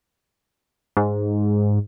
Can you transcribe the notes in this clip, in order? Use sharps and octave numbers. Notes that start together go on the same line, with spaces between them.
G#2